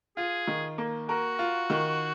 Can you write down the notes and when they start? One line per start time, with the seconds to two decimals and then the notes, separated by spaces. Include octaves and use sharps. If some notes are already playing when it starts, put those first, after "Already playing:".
0.17 F4 G#4
0.47 D#3
0.78 A#3
1.09 F#4 A#4
1.39 F4
1.70 D#3